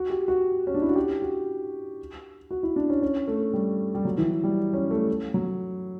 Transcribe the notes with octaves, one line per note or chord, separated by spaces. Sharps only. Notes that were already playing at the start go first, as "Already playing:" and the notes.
Already playing: F#4
G4
F#4
C#4
D4
E4
F#4
G4
F#4
F#4
E4
D4
C#4
C#4
A3
G3
G3
F#3
E3
G3
C#4
A3
F#3